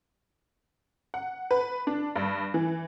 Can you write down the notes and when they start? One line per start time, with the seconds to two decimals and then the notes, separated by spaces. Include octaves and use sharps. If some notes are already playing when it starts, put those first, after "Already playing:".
1.14 F#5
1.51 B4
1.87 D4
2.16 G2
2.54 E3